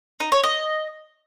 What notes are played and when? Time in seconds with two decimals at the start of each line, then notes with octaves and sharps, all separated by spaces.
0.20 D#4
0.32 C#5
0.44 D#5